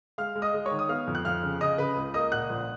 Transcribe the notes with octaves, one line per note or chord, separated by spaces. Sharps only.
G#3 F5 F6
G#3
D#5 D#6
G#3
C#5 C#6
D#3
D#6
B3 F5 F6
F2
F#6
F2 F5 F6
C#3
C#3 D#5 D#6
C#3 B4 B5
C#2
A#3 D#5 D#6
A#2 F#5 F#6
A#1